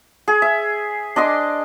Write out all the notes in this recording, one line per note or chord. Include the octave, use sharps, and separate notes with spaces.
G#4
E5
D4 D#5 C6 D6